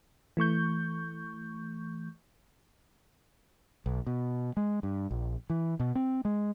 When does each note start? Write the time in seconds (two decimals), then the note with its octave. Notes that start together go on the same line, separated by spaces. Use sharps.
0.37 E3 A3 C#6 G6
3.86 B1
4.07 B2
4.57 G#3
4.83 G2
5.11 A#1
5.50 E3
5.80 B2
5.95 C4
6.25 G#3